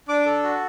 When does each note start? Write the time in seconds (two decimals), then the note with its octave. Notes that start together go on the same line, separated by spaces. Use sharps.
0.08 D4 D6
0.26 A4
0.44 F#4